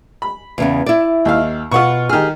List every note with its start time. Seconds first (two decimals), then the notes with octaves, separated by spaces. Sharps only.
0.22 B5
0.58 E2 C#3 B3
0.86 E4 D5
1.25 D#2 E5 F5
1.71 B2 F4 F#5 C#6
2.09 D#3 G4 G#4 F6